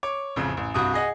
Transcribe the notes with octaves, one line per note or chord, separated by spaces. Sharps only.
C#5 D6
A1 F2 C#3
A1
C2 G2 F#4 D#6
G#4 D#5 F#5